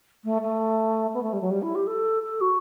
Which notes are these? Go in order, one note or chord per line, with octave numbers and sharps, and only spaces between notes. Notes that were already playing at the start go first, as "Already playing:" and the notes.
A3
A3
B3
A3
G3
F#3
G3
E4
G4
A4
A4
F#4